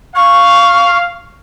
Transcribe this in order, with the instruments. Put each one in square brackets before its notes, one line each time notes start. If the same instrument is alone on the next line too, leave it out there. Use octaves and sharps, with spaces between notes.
[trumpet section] F5 [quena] C#6